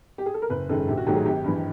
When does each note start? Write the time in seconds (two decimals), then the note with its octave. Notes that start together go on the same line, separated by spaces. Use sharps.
0.18 G4
0.26 G#4
0.34 A4
0.42 A#4
0.50 F#1 B4
0.69 F#2 D#3 G#3 A4
0.88 A#1 G4
0.98 F#4
1.07 G#2 D#3 F#3 A3 G4
1.16 G#4
1.26 G#1 G4
1.44 G2 E3